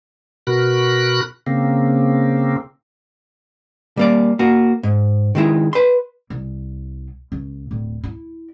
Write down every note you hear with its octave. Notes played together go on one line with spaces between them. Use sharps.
B2 F#4 A#4 B5 F#6
C#3 A#3 C4
G3 A#3 D5
A#3 F#4
G#2
D#3 G#3 E4
B4 C6
C2
C#2
D1
E4